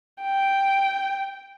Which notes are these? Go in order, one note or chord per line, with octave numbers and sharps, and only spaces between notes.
G5